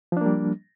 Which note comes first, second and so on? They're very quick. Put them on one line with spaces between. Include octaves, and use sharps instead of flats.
F3 D4 A#3 G3